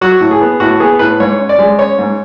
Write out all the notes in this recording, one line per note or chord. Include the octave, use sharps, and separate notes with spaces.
F#3 F#4
A2
G#4
B3
A2 F#4
B3 G#4
A2 B4
G#2 C#5
C#4
D5
G#3
C#4 C#5
G#2